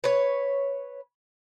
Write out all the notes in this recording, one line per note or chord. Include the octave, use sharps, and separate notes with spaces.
B4 C#5